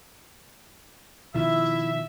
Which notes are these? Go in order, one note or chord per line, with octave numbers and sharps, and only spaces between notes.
B2 D#3 F3 E4 E5